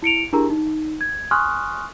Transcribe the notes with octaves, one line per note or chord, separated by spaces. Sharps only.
E4 C#7 D7 F7
D4 E4 G4 G#4 A#4 A#5
D#4
G#6
G#5 C6 C#6 D#6 F6 F#6